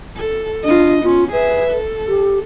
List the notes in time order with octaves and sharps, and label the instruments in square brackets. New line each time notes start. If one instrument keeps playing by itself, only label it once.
[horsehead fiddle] A4
[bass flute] D4 [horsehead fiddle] F4 D#5
[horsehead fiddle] B3 C#4 [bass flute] F4
[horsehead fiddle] G#4 E5 [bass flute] B4
[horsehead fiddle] A4
[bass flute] G4